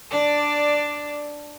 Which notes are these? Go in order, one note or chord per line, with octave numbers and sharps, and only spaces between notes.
D4 D5